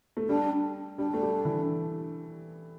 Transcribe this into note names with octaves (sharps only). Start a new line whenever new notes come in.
A3
G3 D4
G3 D4
A3
G3
E3